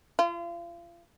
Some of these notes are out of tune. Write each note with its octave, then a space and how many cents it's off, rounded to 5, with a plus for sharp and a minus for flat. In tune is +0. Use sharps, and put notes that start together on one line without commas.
F4 -35